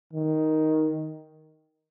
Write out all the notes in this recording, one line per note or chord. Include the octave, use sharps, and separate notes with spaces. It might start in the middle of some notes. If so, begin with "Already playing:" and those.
D#3